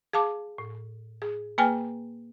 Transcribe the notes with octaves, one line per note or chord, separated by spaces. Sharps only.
G#4 F5 A5 D6
A2
G#4
A#3 G#4 B4 G5 G#5 F6